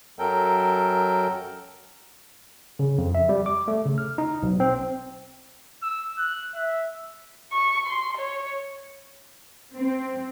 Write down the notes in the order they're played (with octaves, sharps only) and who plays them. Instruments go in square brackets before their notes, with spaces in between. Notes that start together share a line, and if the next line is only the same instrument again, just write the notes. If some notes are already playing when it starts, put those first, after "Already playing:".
[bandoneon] F#2 F#3 A4 A#4 G5
[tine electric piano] C#3
F2
E5
G3
D6
A3
C#3
F6
D#4
B1
C4
[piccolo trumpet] E6
F#6
E5
[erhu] C#6
C6
C#5
[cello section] C4